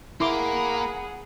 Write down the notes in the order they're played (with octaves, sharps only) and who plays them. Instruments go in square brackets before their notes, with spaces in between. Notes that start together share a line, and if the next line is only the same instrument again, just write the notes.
[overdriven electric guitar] A#3 A#4 [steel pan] E4 C6 D6 [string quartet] G#4 F#5 [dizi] B5